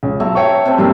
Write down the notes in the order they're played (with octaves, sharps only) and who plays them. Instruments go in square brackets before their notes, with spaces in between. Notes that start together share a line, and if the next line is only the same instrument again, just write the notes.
[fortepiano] C#2
[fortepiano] B1 [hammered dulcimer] E5 A5 A#5
[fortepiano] C#5 G5 C#6
[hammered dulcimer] C3 A3 C4
[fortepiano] G2 A#3 [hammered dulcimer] C4 E4 D5